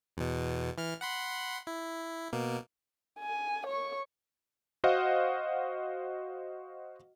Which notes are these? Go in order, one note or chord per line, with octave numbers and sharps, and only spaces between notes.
E2 B2
E3 F6
F#5 B5 C6
E4
B2 A#3
G#5
C#5 C#6
F#4 C5 D#5 F5 F#5